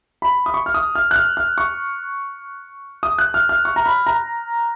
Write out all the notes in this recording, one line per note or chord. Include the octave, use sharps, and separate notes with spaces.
B5
D#6
C#6
F6
D#6
F6
F#6
F6
F6
C#6
D#6
F#6
F6
F6
C#6
A#5
B5
A#5